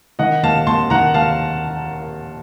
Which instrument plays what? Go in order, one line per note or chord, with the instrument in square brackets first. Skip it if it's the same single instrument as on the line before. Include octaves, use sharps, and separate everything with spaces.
[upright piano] D#3 D#5 F#5
D#2 F5 A5
D#2 A5 C6
D#3 F#5 A#5
D#2 F5 A5